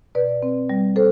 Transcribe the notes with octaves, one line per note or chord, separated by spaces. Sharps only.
B2 B4 D5
C4
G3
A4 C5